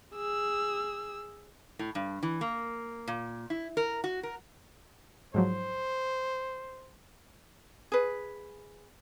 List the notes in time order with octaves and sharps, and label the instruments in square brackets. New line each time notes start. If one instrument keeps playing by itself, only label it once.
[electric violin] G#4 E6
[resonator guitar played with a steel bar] A2
G2
E3
A#3
A#2
E4
A#4
F#4
A#4
[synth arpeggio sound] G#2 F3 F#3 [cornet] C5
[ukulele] G#4 B4